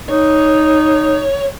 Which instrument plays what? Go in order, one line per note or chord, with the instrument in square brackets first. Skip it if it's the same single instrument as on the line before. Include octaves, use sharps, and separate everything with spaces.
[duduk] D#4 [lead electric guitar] C#5